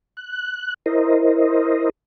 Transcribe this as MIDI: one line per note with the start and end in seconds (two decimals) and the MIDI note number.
0.17 0.74 90
0.86 1.89 64
0.86 1.89 70
0.86 1.89 72
0.86 1.89 75